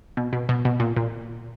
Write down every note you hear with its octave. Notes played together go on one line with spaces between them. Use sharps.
B2
B2
B2
B2
A#2
A#2